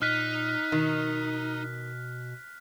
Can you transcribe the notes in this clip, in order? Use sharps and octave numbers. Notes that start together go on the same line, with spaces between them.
A#2 D#4 F6 F#6 B6
B2 D#3